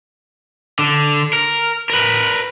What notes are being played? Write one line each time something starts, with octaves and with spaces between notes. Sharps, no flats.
D3
A#4
A#4 B4